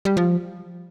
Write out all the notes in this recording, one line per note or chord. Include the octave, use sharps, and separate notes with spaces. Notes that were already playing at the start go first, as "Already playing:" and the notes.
G3
F3